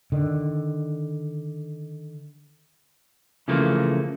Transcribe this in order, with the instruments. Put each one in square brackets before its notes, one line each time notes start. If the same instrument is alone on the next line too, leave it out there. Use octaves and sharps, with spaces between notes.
[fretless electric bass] D3 D#3
[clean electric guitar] C#3 E3 F3 A3 A#3